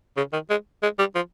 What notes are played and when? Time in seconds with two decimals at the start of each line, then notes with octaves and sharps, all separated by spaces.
0.17 C#3
0.33 D#3
0.50 G#3
0.83 G#3
0.99 G3
1.15 F3